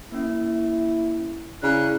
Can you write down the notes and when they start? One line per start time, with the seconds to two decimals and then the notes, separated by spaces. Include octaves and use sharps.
0.12 A#3 C#4 E4
1.63 C#3 E4 D5 A#5 F#6